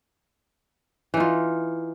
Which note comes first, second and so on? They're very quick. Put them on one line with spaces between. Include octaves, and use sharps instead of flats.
E3 D#4 F4